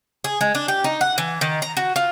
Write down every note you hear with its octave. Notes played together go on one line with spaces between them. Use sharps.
G#4
G#3
D4
G4
D#4
F#5
E3
D#3
A#5
F#4
F4